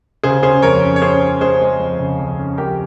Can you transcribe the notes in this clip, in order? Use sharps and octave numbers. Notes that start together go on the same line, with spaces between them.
C#3 G#4 C5
C#4 G#4 C5
F2 A#4 C#5
C#4
C#5
C#4 G#4 C5
C#4
G#3 G#4 C5
G#3
F2
C#3
F2
C#4
F2 G4 A#4